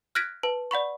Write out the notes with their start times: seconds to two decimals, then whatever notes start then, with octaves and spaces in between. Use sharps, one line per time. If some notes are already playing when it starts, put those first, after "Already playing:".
0.15 F6 F#6 G#6 A#6 B6 D7
0.43 B4 A5
0.71 D5 F#5 B5 C#6